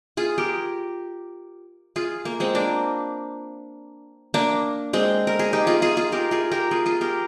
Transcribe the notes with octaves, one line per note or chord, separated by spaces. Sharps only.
F4 G#4
G4 A#4
F4 G#4
A#3
G#3 C4
A#3 D4
A#3 D4
G#3 C4
A#4
G#4
D#4 G4
F4 G#4
F4 G#4
F4 G#4
G4 A#4
F4 G#4
G4 A#4
F4 G#4
F4 G#4
G4 A#4